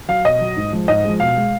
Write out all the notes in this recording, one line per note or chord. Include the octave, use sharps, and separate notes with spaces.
F#3 F5
B2 D#5
F#3
G#2
F3 G#3
G#2 D#5
F3 G#3
B2 F5
G#3